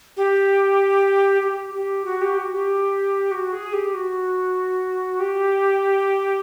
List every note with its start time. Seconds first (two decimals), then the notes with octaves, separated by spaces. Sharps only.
0.17 G4
1.42 G4
1.74 G4
2.05 F#4
2.21 G4
2.37 F#4
2.53 G4
3.31 F#4
3.52 G#4
3.73 G4
3.94 F#4
5.20 G4